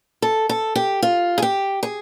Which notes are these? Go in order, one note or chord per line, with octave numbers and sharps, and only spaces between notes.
A4
A4
G4
F4
G#4
G4
G#4